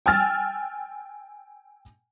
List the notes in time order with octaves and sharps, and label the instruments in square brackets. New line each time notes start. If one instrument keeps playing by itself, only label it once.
[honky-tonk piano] G5 G#5 E6 F6 A6